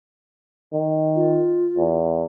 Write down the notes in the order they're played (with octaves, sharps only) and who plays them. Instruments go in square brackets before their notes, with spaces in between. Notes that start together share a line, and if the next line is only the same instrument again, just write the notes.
[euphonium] D#3
[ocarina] F4
[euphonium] E2